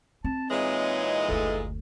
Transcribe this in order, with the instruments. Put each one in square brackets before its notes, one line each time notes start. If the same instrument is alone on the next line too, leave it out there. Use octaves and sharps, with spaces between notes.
[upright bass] C4 [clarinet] A5
[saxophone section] A#2 E3 G#3 [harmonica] D#4 [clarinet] C#5
[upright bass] F#1 D2 [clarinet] A4